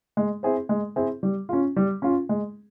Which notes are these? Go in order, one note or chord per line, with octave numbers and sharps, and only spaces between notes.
G#3
C4 E4 G#4 C5
G#3
C4 E4 G#4 C5
G3
C#4 F4
G3
C#4 F4
G#3